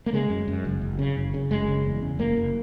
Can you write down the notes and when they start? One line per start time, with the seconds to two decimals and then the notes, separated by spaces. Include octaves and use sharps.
0.06 A#3
0.13 C#3 G#3
0.30 F#2
0.48 F#2
0.65 F#1
0.81 F#1
0.99 C#3
1.17 F#1
1.34 C#3
1.51 F#1 G#3
1.68 C#3
1.86 E2
2.02 C#3
2.19 F#1 A#3
2.37 F#1